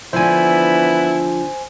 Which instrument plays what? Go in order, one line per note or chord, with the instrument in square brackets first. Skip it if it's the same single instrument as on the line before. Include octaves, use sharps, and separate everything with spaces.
[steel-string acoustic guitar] D3 F3 [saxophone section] E3 B3 E4 [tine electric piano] C5 G#5